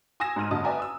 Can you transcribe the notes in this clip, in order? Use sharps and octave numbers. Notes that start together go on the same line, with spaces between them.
G#5 D#6 E6 G#6 A#6 E7
G#2 C6 F6 D#7
F#1 D3 F#4 D#5 A5 D#6
B4 D5 E5 G#5 A#5
D#6 E6